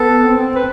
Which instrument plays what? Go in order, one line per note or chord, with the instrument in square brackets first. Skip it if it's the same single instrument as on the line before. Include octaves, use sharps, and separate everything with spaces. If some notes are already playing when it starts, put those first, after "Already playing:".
Already playing: [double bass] B3 [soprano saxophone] A4
[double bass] C4
[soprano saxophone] B4